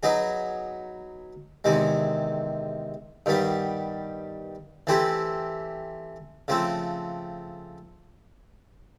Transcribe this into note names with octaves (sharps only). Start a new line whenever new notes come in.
F#3 B3 D#4 G#4
E2 C3 D#3 G#3
G2 D#3 G3 B3
E3 A3 C4 E4 G4
C#3 F3 A3 C4